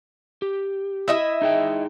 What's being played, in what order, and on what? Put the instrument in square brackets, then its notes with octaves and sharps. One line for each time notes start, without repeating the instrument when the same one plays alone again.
[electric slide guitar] G4
[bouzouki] E4 D#5 E5
[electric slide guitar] D#4 G#4 G5